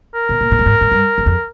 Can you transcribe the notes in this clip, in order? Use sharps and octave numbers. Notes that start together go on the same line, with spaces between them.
A#4
B2
A#2
A#2
A2
G#2
G#2
G2
E2
F2